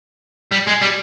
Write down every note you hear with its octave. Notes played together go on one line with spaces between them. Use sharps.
G3
G#3
G3